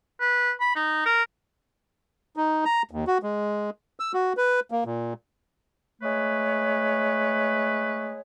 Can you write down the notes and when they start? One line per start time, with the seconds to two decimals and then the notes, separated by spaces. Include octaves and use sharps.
0.20 B4
0.60 B5
0.76 D#4
1.06 A#4
2.37 D#4
2.65 A#5
2.91 D#2
3.07 F#4
3.23 G#3
4.00 E6
4.14 F#4
4.37 B4
4.71 A#3
4.86 A#2
6.02 G#3 A3 B4 C#5